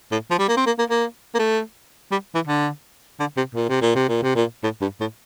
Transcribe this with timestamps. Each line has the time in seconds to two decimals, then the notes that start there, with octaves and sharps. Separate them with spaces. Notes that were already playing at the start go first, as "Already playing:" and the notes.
0.12 A2
0.31 F3
0.39 G3
0.48 A#3
0.57 C4
0.66 A#3
0.79 A#3
0.90 A#3
1.35 A#3
1.39 A3
2.11 G3
2.35 E3
2.47 D3
3.20 D3
3.37 C3
3.55 A#2
3.69 C3
3.81 A#2
3.95 C3
4.09 A#2
4.23 C3
4.36 A#2
4.63 A2
4.81 G2
5.00 A2